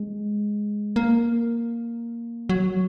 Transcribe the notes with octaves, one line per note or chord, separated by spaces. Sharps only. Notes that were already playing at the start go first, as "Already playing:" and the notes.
Already playing: G#3
A#3
F#3